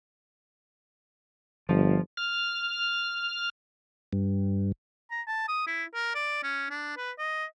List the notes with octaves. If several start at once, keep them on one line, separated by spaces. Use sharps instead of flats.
G1 F3
F6
G2
A#5
A5
D#6
E4
A#4
D5
C#4
D4
B4
D#5